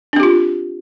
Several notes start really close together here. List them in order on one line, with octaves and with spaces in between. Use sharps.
D4 C4 G4 F4